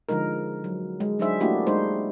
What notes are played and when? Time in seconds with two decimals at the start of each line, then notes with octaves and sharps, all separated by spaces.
0.09 D3 F3 G#3 D#4 A#4
0.64 F#3
1.00 G#3
1.19 F#3 D4 D#4 G#4 C5 E5
1.40 A3 A#3 D4 E4 F#4 G4
1.67 G#3 D4 D#4 C5